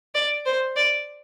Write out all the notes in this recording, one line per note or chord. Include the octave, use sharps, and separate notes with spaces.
D5
C5
D5